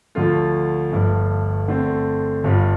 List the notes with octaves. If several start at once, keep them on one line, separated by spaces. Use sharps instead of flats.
D2 D3 F3 A3 F4
G1 G2 F3 A3
D3 A3 C4
G1 G2 G3 F4